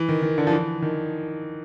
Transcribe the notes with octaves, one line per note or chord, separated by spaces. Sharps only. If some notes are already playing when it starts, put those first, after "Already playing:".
Already playing: E3
D#3
D#3
D3
F3
E3
D#3